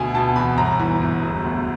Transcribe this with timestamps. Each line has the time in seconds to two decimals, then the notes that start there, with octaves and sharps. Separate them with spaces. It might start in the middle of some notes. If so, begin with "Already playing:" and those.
Already playing: D2 B2 G#5
0.14 B2 A5
0.36 E2 B5
0.58 G1 A#5
0.79 E3
1.01 G1
1.22 E1
1.44 D2